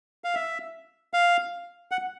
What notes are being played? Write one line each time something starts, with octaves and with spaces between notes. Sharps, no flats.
F5
E5
F5
F#5